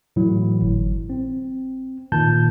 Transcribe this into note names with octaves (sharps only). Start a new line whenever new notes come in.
A2 E3 F#3 E4
G1
C4
A#2 D#3 A5 G6